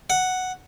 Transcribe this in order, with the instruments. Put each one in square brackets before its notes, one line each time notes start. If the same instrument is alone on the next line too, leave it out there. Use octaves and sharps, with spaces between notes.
[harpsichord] F#5